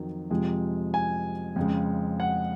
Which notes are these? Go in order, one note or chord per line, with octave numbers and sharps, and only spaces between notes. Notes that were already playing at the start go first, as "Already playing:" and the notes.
Already playing: F2 D#3 F#3
F2 C3 F3 G#3
G#5
F2 C#3 G#3
F#5